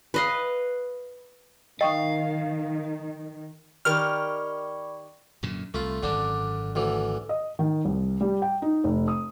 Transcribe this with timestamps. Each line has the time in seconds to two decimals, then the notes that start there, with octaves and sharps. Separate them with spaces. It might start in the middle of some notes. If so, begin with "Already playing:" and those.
0.14 B4 D#5 F5
1.81 D#3 D#5 F5 G5 C#6 D#6
3.85 D#3 G4 A#4 D5 B5 C#6 F6
5.43 F#2 A#2 D3
5.74 C2 A3 F4
6.03 G#1 F#2 D3 D4
6.75 D2 D3 E3
7.29 D#5
7.59 D#3
7.85 C2
8.21 G3
8.42 G5
8.62 D#4
8.84 F1
9.08 D#6